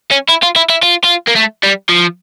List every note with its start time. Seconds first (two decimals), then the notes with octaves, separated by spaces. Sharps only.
0.11 C#4
0.28 E4
0.43 F4
0.56 E4
0.70 E4
0.83 F4
1.04 F4
1.28 A#3
1.36 A3
1.63 G3
1.90 F3